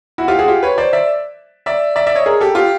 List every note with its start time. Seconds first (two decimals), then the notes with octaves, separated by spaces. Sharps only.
0.18 E4 F#4
0.28 F4 G4
0.39 F#4 G#4
0.48 F4 G4
0.63 B4 C#5
0.78 C5 D5
0.93 D5 E5
1.66 D5 E5
1.96 D5 E5
2.07 D5 E5
2.15 C#5 D#5
2.26 G#4 A#4
2.40 G4 A4
2.55 F4 G4